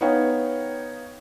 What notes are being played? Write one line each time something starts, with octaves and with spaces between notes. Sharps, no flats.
B3 D#4 C#5 F5 G5